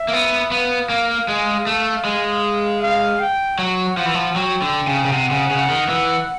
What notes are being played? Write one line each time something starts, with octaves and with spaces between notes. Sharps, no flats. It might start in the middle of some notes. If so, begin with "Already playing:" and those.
Already playing: E5
A#3
B3
B3 F5
A#3
G#3
A3
G#3
F5
G5
F#3 F#5
F3 F#5
E3
F3
F#3 G5
D3
C#3
C#3
C3 F#5
C#3
C#3
D#3
E3